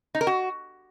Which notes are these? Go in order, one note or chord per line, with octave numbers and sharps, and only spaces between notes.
D#4
A#4
F#4